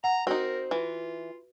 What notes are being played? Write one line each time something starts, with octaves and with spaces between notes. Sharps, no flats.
F#5 A#5
C4 D#4 F#4 A#4
E3 F4